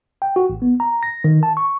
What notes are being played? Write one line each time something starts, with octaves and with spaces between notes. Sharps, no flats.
G5
F#4
A1
B3
A#5
A#6
D#3
A5
C#6